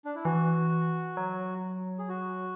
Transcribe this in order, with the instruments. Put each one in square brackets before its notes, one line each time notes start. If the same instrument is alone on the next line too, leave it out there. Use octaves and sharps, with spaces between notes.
[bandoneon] D4
E4
[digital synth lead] E3 [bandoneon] F#4
[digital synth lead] F#3
[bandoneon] G#4
F#4